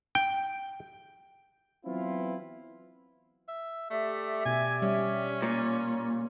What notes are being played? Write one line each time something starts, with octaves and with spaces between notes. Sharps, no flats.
G5
E3 F#3 B3 C4 E4 F4
E5
A3 G4 D5 E5
B2 G#5
G3 C#4
A#2